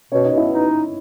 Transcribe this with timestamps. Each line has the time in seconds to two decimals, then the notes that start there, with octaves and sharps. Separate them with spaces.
0.12 B2 C#4 C#5
0.24 D#4 D#5
0.31 B2
0.37 E4 E5
0.50 D#4